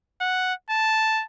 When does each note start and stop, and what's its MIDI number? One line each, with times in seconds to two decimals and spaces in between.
0.21 0.54 78
0.70 1.23 81